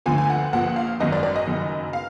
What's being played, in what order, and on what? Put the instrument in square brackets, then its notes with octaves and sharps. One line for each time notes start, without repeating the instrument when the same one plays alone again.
[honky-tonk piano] D2 D3 F3 G#5
G#5
F#5
A#1 A#2 F3 F#5
F5
G#1 F#2 D#3 D#5
D5
D5
D#5
F#1 F#2 D#3
F5